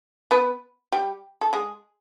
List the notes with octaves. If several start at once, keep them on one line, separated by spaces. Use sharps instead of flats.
B3 B4
G3 G4
A4
G#3 G#4